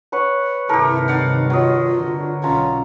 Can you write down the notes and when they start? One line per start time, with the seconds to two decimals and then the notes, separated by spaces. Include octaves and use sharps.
0.12 B4 C#5 F#5
0.69 G2 C3 D#3 E4 G4 A4 A#4
1.08 D#4 D5 F5 F#5
1.50 F#3 F4 D#5
2.01 D3
2.44 B1 C#4 F4 A#5